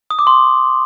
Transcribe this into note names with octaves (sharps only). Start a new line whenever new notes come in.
D#6
D6
C6